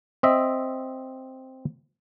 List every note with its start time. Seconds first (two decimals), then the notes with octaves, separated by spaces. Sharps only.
0.23 C4 D#5 E5